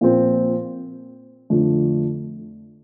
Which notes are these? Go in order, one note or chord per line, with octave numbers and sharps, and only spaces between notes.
A#2 F3 C4
F2 D3 A3